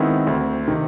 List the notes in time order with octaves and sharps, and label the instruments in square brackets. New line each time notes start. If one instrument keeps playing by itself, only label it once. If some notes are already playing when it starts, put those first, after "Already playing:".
Already playing: [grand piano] D#3 G#3 B3 E4 [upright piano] C4
[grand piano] D2
C3 D#3